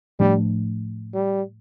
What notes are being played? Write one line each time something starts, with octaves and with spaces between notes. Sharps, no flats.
A2 F3 G3 A3 D4
G3